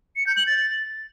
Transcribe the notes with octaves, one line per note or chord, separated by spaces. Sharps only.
C#7
G6
F#7
A6